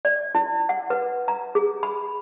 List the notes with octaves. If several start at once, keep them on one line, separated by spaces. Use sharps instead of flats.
D5
E4
F#5
B4
A#5
G#4
B5